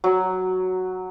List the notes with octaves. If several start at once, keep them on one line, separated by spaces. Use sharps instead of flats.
F#3